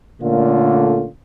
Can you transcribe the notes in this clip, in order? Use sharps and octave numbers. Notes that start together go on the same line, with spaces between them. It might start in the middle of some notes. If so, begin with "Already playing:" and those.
A#2 D3 A3 A#3 C#4 F4